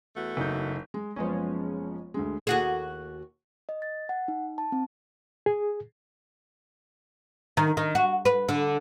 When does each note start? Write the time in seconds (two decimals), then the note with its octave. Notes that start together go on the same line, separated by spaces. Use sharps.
0.17 E2 A3 F#4
0.37 F#1 D#4 G6
0.94 G#3
1.16 F#1 F3 G#3 B3 C#4
2.14 D2 D3 G#3
2.47 D#2 F#4 G#4
3.69 D#5
3.82 A6
4.09 F#5
4.28 D#4
4.58 A5
4.72 C4
5.46 G#4
7.57 D#3
7.77 D#3
7.95 F#4
8.25 B4
8.48 D3